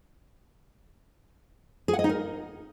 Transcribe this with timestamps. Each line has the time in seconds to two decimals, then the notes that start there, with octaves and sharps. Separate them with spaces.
1.88 G#4
1.94 F#5
1.99 D#5
2.04 D#4
2.09 A#4